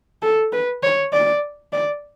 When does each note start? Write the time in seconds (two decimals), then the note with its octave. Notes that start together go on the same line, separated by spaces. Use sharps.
0.22 A4
0.52 B4
0.83 C#5
1.12 D5
1.73 D5